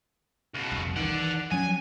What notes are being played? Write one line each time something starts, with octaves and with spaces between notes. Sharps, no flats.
C#2 B2
F1 C2
D#3 E3 D5 F#5
F3 F#3 C#4 G#5